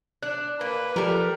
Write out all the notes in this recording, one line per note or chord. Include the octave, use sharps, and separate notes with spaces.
D4 F#6
A#3 B4
F3 G3 G4 A4 A#4